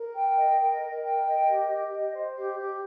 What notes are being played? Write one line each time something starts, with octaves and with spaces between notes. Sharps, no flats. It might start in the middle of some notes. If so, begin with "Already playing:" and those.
Already playing: A#4
G5
D#5
A#4
A#4
G5
D#5
G4
G4
D#5
C5
G4
G4